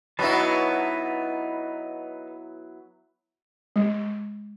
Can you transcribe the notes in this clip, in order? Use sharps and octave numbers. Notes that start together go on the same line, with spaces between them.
F#3 B3 D#4 E4 B4 A5
G#3